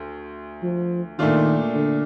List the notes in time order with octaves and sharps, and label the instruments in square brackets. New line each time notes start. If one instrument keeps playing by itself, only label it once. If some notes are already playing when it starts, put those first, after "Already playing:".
Already playing: [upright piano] D2
[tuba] F3
[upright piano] A#2 A3 D4 F4 [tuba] D#3
[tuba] D3